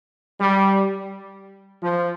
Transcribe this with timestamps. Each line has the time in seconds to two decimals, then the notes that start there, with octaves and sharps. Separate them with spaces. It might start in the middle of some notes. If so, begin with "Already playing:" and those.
0.40 G3
1.81 F3